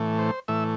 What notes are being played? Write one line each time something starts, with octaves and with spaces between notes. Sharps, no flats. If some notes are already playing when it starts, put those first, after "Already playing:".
Already playing: A2 E3 A3
C5
A2 E3 A3 E5